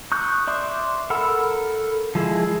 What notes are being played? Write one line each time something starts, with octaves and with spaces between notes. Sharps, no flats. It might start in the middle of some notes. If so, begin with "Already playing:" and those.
C#6 D#6 F#6 G6
D5 E5 C6 D6
A4 A#4 F#5 B5 E6
F3 G#3 E4 G#4